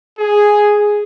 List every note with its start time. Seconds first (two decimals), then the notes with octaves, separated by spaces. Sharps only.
0.20 G#4